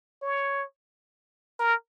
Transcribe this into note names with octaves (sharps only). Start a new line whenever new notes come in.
C#5
A#4